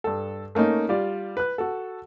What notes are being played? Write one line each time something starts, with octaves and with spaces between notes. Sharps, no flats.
G2 A4
A3 A#3 C#4 D#4
G3 F4 D5
B4 F#6
F#4 A4